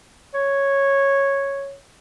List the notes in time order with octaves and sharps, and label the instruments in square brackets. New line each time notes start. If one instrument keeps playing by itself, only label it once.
[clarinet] C#5